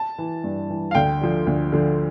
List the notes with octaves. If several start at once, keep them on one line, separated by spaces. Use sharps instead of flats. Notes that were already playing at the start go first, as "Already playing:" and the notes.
Already playing: A5
E3
G2
E3
F5
D2 G5
D3 F3
D2
D3 F3